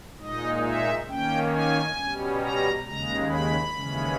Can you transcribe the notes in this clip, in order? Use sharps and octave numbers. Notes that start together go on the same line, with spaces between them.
A#2 G#3 D#4 D#5
E5
D#3 A#3 C#4 G5
G#5
B2 G3 C#4
A#5
D#2 C#3 G#3 A#5
B5
D#2 C#3 E3 G#3 C#4